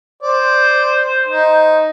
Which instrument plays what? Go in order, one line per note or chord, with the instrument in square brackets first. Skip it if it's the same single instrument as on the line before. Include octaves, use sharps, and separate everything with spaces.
[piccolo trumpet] C5 [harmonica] D5
[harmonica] D#4